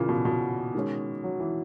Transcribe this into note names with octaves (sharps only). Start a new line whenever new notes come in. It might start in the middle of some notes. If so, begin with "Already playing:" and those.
Already playing: A#2 C#3 E3 A#3 C#4
B2
B2
D#3 G#3 C#4
F#3
E3